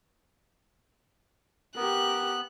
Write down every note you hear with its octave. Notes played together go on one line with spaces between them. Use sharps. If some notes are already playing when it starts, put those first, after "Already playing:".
B3 G4 A#4 F#6